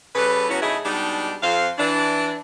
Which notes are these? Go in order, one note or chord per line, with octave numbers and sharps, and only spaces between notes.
C#3 G3 A4 B4
C#3 F#3 B3 C#4 E4 F#4
A2 C#3 D#4 E4 G#4
B2 G3 G#3 D4 D#4 G4
F2 C5 F5
E3 D4